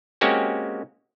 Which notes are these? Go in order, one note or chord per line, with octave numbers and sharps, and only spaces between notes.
G#3 A#3 C4 C#4 F#4 G4